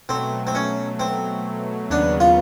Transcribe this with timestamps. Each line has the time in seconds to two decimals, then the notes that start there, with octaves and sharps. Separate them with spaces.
0.09 B2 F#3 A3 C4
0.47 C4
0.55 C#4
1.00 C4
1.90 D#2 C#3 F#3 B3 D4
2.20 F4